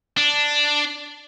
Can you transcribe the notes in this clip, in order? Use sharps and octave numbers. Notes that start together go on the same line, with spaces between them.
D4